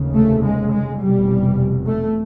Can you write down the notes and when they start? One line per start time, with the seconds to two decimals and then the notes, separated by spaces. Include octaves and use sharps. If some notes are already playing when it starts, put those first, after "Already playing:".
Already playing: F1 D#2 C#3
0.15 A3
0.43 G#3
0.71 G#3
1.00 F1 E2 B2 G3
1.86 A3